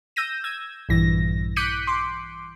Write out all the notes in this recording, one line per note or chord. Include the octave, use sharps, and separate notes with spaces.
E6 G6 A#6 D#7
E6 G#6
A#1 G2 E3 A#6
D6 F#6 G6 B6 C#7 D#7
C6 D6